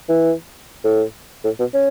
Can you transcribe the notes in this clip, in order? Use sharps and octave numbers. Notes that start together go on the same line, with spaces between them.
E3
A2
A2
B2
C#4